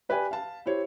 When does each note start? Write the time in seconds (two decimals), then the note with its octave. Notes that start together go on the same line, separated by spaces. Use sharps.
0.09 G4 B4 D5 G5 G#5
0.31 F5 A5
0.66 E4 G4 C5 C#5